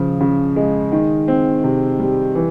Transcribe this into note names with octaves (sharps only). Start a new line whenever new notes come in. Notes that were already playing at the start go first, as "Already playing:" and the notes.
Already playing: C#3 F3
C#3
G#3
D#3
C4
C3
G3
E3